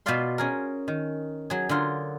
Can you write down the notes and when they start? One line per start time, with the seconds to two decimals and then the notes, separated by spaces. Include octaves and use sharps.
0.06 B2 B3 F4 D5 F5 C6
0.38 C#4 G#4 A#4
0.88 D#3
1.50 F#3 G#4
1.69 D3 F#3 F4 A#4